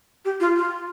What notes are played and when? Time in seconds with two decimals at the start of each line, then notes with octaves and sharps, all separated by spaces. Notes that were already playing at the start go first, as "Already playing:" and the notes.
0.25 G4
0.40 F4
0.56 F4